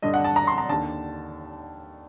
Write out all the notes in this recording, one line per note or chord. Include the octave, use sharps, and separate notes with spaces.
G2 D3 D#5
F#5
A5
A#5
C6
A#5
D#2 D3 A5